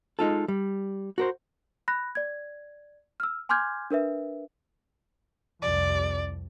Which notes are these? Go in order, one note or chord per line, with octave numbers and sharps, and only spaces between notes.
G#3 D#4 F4 A4
G3
F#4 A#4 C5
B5 F#6 A#6
D5 G#6
E6 F6
G#5 C6 D6 F6 G6 G#6
D4 A#4 B4 E5
C2 F2 D5